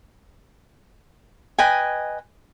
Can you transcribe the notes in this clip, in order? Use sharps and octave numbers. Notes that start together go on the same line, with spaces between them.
B4 D#5 G5 G#5